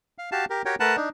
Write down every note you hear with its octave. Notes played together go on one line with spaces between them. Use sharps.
F5
F#4 G4 F5 A5
G4 A#4
F#4 G4 A#4 C#5 G5
A3 A#4 B4 F#5 A5
D4 D#4